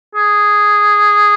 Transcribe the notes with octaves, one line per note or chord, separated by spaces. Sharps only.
G#4